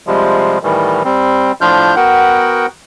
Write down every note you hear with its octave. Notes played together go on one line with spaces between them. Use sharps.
C3 F3 G3 G#3
A2 D#3 E3 G3
G3 C4
A2 F3 D4 F4 F6 G6
B3 F#4 A#4 F#5 G5